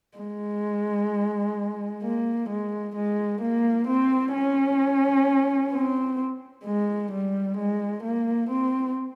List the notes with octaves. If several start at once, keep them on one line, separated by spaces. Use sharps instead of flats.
G#3
A#3
G#3
G#3
A#3
C4
C#4
C4
G#3
G3
G#3
A#3
C4